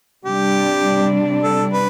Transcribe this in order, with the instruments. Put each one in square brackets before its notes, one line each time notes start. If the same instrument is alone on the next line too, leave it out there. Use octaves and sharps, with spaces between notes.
[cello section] C3 G3 D4 [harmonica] G4
[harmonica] A4
B4